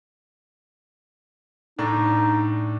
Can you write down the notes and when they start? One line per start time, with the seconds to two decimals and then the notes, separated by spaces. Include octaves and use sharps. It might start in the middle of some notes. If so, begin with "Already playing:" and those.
1.79 A2 D4 D#4